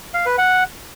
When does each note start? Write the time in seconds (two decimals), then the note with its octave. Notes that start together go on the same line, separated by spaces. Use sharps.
0.14 F5
0.26 B4
0.38 F#5